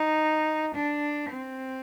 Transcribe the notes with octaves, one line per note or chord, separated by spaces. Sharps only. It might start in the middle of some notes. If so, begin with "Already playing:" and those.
Already playing: D#4
D4
C4